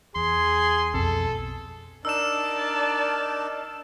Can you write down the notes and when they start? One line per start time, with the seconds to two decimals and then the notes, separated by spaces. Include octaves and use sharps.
0.16 E2 G#4 C6
0.94 B1 F2 A4
2.05 D4 D#4 A#4 D5 A5 E6 E7